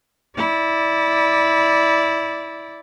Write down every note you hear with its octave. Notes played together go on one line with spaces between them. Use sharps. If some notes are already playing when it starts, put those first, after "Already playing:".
E4 D5